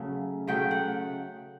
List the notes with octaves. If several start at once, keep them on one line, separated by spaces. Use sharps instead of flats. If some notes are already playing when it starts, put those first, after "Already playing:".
Already playing: C#3 F#3 A3
C#3 F#3 A3 G5
F#5